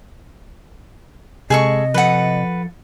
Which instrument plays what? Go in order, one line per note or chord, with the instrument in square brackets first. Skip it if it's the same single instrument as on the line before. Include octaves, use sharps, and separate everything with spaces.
[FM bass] C3 [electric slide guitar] G#3 [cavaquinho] G#4 A4 C#6 [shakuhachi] D#5
[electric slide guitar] F3 A4 [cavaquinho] B4 F#5